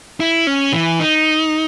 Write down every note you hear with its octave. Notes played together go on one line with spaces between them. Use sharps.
E4
C#4
E3
D#4